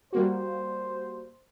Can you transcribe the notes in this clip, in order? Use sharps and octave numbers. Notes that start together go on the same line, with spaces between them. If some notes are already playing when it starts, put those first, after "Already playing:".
G3 A#3 F#4 C5